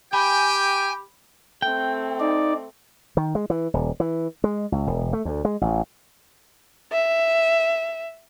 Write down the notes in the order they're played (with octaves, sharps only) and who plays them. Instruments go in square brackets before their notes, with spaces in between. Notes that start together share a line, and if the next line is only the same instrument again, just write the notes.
[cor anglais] G4 [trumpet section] G5 [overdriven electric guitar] G#5 [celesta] B5
[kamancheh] A3 C4 [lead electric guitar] G5
[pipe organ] D#4 D5
[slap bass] D#3
G#3
E3
D#1
E3
G#3
C#2
E1
A3
D2
G#3
A1
[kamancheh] E5